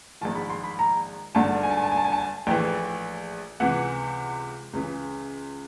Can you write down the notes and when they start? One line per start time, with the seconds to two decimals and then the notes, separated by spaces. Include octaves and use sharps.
0.21 A#1 G#2 D#3 A5
0.35 B5
0.50 C6
0.64 B5
0.79 A#5
1.35 G#1 G2 D3 A5
1.63 G#5
1.70 A5
1.77 G#5
1.84 A5
1.91 G#5
1.97 A5
2.05 G#5
2.12 A5
2.18 G#5
2.47 A#1 A2 E3 G5
3.60 C#2 C3 E3 F#5
4.73 C#2 C#3 E3